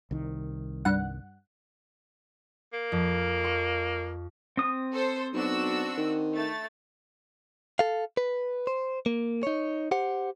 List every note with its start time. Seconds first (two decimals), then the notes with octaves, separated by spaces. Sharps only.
0.11 C2 D#3
0.85 G2 F#5
2.73 A#3
2.92 F2
3.44 C#6
4.57 C4 D#6
4.91 A4 C5
5.33 B1 D4 F#4 E6
5.97 D#3
6.35 A3 A6
7.79 A4 F5
8.17 B4
8.67 C5
9.06 A#3
9.43 D#4 C#5
9.91 G4 C5 F#5